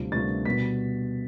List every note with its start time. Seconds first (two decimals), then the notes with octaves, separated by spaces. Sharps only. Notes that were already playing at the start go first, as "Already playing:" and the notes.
Already playing: D2 C3 G3 D4 F4
0.12 D2 C3 G3 D4 F4 A6
0.46 B2 G3 B3 B6